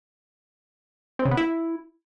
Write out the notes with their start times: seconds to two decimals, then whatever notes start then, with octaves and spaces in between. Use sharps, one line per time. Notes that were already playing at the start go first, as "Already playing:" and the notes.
1.19 C4
1.25 C#3
1.31 B3
1.37 E4